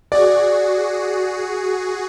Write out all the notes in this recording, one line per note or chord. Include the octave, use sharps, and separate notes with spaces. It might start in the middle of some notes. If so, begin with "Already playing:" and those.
F#4 G#4 D5